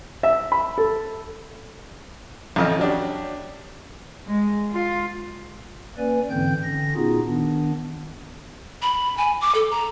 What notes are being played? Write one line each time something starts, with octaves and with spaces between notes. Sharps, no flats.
E5
B5
A4
A1 F2 D#5 F6
F#3 D4 G4
G#3
F4
A#3 C#4 B4 D5 G#5
G#2 D3 E3 C4 G5 G6
D3 C#4 A#6
A#2 B3 D#4 F4 F#4 G#4
D#3 B3 D4
B5
G#5
D6
A4
A#5